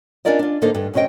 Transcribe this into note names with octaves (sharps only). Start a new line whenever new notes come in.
C#4 D4 F4 A#4 D5 D#5
D4 F4
G#2 D3 A#3 D#4 A4 C5
G2 D3
F#2 C3 C#4 C5 D#5 G5